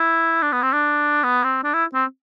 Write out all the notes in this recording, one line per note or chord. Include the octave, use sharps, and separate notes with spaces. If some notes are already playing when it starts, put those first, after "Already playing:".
Already playing: E4
D4
B3
C4
D4
B3
C4
D4
E4
C4